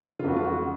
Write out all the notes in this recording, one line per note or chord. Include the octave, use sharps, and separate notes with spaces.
F2 C#3 F4 F#4
F4
F#4